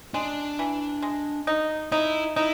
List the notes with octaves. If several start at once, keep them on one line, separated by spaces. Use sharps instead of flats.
G#3 D4
E3
G#3
D#4
D#4 E4
D#4 E4